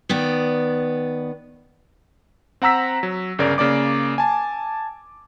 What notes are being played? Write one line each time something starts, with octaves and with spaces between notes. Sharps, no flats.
D#3 B3 D5
C4 F#5 A#5 E6 B6
F#3
G1 C#3 A#4 D5
C#3 A#3 D5 D6
G#5 A5